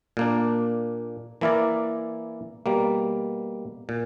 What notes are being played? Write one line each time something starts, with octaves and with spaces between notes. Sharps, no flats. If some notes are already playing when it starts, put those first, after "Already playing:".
A#2 A#3 D4
E3 A#3 E4 A#4 D5
B2 G3 A#3
A#2